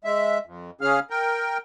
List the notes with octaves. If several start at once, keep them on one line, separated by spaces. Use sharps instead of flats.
G#3 E5
F2
C#3 C#4 G#4 F5 F6
A#4 G5